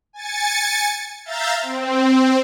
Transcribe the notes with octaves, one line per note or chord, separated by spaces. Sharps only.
G#5 A6 C#7
E5 F5 A#5 G6 A6
C4